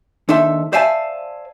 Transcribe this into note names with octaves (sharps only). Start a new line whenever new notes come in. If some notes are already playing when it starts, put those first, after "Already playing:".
D#2 D4 D#4 A4 E5 C6
C5 D5 E5 F5 G#5 A5